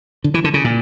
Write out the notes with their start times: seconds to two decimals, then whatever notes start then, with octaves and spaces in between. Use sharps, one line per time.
0.24 D3
0.34 E3
0.44 D3
0.54 C#3
0.64 A#2